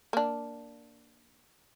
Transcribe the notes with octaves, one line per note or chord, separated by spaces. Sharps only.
A#3 D4